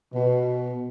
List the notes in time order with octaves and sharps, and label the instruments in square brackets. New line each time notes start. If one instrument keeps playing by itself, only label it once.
[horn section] B2